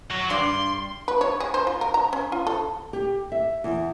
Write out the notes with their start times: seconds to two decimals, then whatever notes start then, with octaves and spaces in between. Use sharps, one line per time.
0.10 F#3 F#4
0.30 G2 D5 C6
1.08 B4
1.21 C#5
1.40 G#4
1.54 C5
1.67 F4
1.81 A#4
1.94 A#5
2.13 C#4
2.32 F4
2.47 A4
2.93 G4
3.32 E5
3.64 E2